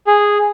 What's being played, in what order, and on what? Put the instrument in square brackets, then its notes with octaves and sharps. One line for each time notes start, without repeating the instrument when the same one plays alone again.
[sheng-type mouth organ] G#4